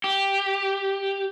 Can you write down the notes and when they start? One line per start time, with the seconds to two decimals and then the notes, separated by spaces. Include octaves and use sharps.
0.04 G4